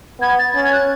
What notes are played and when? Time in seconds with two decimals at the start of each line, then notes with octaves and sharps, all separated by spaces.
0.21 B3 G#6
0.39 A6
0.55 C#4 A6
0.65 G#6
0.73 F#6